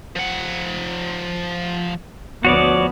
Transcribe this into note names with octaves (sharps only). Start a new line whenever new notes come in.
F3 F#5
D2 F3 B3 F#4 C#5 D5